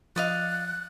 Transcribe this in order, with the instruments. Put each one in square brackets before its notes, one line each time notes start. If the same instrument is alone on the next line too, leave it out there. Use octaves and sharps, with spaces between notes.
[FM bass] F3 [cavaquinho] D5 D#5 F5 [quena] F#6